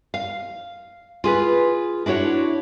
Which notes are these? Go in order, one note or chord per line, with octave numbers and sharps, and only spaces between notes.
F5
F4 G#4 B4
D4 E4 F#4 C#5